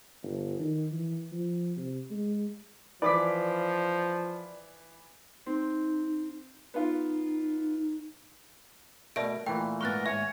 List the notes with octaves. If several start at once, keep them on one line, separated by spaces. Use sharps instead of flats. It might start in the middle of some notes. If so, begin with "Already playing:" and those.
G1
D#3
E3
F3
C3
G#3
E3 F3 D5 B5 D6 B6
C4 D#4
B3 D#4 F4
B2 A3 A#4 D5 E5 D7
A#2 E3 A3 G5
G#2 B3 A#4 C#6 F#6 A6
D#2 G#2 C#5 E5 G#5